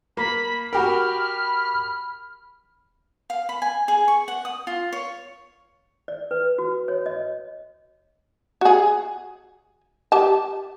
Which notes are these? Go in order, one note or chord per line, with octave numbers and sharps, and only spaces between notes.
A#3 B5
F#4 G4 A#4 B5 F6
F5
B5
G#5
G#4
C#6
F#5
D#6
F4
C#5
D5
B4
F#4
C#5
D#5
F#4 G#4
G4 A5